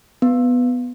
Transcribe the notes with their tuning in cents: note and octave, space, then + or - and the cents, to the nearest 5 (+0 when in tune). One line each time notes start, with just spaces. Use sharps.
B3 +5